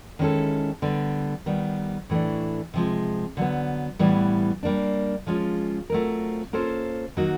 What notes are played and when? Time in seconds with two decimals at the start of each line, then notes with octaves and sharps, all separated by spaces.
0.19 D#3 G#3 C#4 E4 A4
0.82 D3 G3 B3
1.46 D#3 G3 B3
2.10 A2 E3 A3 D4
2.74 C3 F3 G#3
3.37 D3 F#3 B3
3.99 A2 E3 G3 B3
4.63 G3 A#3 D4
5.27 F3 G#3 C#4 F4
5.90 F#3 A3 C4 F4 A#4
6.53 A#3 C#4 F4 A4 C5
7.17 D#3 F#3 A#3 D#4 F#4